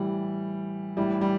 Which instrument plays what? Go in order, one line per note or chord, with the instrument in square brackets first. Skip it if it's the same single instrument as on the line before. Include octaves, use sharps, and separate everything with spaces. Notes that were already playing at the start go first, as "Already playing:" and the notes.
Already playing: [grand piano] A2 E3 G3
A2 E3 G3
G3